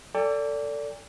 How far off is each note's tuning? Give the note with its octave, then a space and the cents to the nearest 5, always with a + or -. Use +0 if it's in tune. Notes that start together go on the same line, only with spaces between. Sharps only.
A4 +25 D5 -20 G5 +40